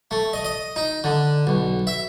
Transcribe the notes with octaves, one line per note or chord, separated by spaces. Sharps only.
A3
D#5
D#5
D#4
D3
B1
E5